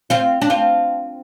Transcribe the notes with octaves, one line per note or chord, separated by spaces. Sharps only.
C4 F4
D4
C4 F4